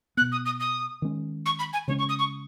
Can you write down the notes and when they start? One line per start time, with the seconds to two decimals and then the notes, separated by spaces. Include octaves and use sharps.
0.17 B3 F#6
0.21 B2
0.32 D#6
0.46 D#6
0.60 D#6
1.02 D#3 G#3 C#4
1.46 C#6
1.59 B5
1.73 G#5
1.88 C#3 G#3 C#4 C#5
1.99 C#6
2.09 D#6
2.19 C#6